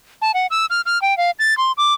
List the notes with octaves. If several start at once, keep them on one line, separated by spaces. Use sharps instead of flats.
A5
F#5
E6
F6
F6
G5
F5
A6
C6
D6